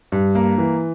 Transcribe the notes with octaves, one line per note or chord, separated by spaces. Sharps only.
G2
A#3
E3